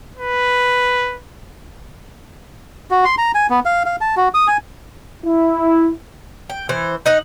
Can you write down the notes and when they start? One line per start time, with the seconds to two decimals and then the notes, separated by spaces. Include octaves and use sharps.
0.17 B4
2.91 F#4
3.05 C6
3.18 A#5
3.35 G#5
3.50 B3
3.65 F5
3.86 F5
4.01 A5
4.17 F#4
4.34 D#6
4.47 G#5
5.26 E4
6.50 G5
6.69 E3 C5
7.06 D#4 D#5 F#5